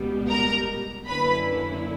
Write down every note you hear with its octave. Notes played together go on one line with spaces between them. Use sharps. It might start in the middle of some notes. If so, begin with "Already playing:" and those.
Already playing: C#2 B2 G3 B3
A#4 A#5
F#2 D3 A#3 C#4 E4 B4 B5